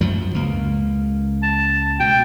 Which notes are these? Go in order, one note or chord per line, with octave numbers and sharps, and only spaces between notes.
F#2 F3 F#3
C#2 A#3
A5
B2 G5